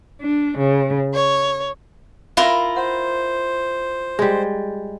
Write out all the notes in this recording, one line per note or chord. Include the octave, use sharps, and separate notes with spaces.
D4
C#3
C#5
E4 F4 A#4 F5
C5 F#5
G3 G#3